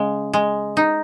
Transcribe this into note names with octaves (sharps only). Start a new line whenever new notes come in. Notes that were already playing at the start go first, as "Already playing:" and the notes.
Already playing: C#3 G#3
G#3
D#4